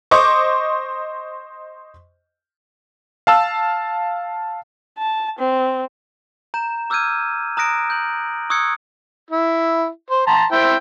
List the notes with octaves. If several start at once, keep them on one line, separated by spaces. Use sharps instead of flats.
C5 D#5 C#6 D6
F5 A5 E6
A5
C4
A#5 G6 E7
D6 E6 F6 G6 G#6 D#7
A#5 D#6 F#6 A#6 D7
G6 F#7
C#6 D#6 E6 F#6 G#6 C#7
E4
C5
A5 A#5 C6
E4 C5 G5